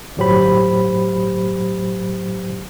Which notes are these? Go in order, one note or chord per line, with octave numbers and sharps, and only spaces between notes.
G1 A2 F#3 G4 C5 B5